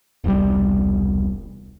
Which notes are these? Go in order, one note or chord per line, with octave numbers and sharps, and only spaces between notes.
E1 C2 G3